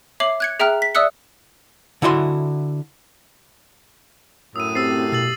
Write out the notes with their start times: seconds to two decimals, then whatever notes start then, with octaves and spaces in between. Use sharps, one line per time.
0.20 C#5 E5 D6 C7 F#7
0.40 F#6 G#6 C#7
0.60 G#4 E5 G5 A#5 F6 F#6
0.82 B6
0.95 D5 E5 D#6 E6 F#6 C#7
2.02 D3 E4 F#4 C6
4.56 F#2 A2 D#6 E6 D#7
4.75 C4 G4 E6 A6 C7
5.12 B2 E6 A6 F#7